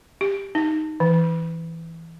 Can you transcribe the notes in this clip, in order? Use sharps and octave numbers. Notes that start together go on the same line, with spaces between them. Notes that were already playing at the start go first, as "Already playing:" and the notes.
G4
D#4
E3